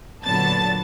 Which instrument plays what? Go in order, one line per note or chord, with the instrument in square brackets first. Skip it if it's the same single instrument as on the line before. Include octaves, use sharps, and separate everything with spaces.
[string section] A#2 D3 F#3 B3 A5 A6